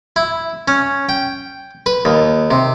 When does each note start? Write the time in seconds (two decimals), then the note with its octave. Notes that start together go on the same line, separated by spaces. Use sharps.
0.16 E4
0.68 C#4
1.09 G5
1.86 B4
2.05 D#2
2.51 C3